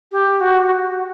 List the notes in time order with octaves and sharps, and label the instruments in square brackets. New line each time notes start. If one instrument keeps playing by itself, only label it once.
[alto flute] G4
F#4